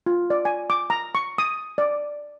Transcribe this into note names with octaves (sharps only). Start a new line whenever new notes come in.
F4
D5
G#5
D6
A#5
C#6
D#6
D5